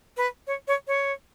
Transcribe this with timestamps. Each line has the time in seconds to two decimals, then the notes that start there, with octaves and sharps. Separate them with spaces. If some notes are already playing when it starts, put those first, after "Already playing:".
0.17 B4
0.47 C#5
0.68 C#5
0.87 C#5